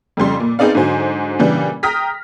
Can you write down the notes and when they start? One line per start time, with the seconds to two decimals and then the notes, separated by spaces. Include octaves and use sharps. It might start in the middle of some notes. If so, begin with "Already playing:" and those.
0.17 F2 C#3 G3 C6
0.40 A#2
0.59 B3 C4 D#4 G#4 D5 F5
0.75 G#2 D3 F#3 C5 G#5
1.39 A#2 C#3 E3 G3 D4
1.83 G5 A#5 D#6 F6 A#6 B6